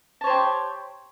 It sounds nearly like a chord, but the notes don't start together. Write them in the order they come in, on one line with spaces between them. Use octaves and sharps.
A5 C#5 C5 G4